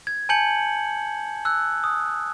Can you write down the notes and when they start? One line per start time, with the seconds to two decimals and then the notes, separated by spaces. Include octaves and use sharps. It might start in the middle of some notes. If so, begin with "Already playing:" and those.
0.07 G#6
0.29 G#5 A5 G6 C#7 F#7
1.45 E6 F#6
1.84 D#6